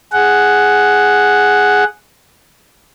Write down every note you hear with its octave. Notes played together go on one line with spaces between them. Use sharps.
G#4 F#5